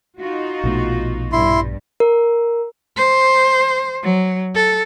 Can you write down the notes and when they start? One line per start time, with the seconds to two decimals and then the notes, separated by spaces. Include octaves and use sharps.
0.19 D#4 F4 F#4
0.64 A#1 B2 A3
1.32 G2 E4 C6
2.00 A#4
2.97 C5
4.03 F#3
4.55 A4